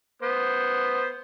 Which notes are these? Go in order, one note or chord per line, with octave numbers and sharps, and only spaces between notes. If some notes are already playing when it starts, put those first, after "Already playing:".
B3 C5